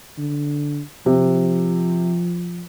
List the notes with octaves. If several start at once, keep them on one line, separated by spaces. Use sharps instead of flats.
D3
C3 F3